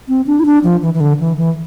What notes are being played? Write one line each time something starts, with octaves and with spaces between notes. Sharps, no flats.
C4
D4
E4
D4
F3
E3
E3
D3
E3
E3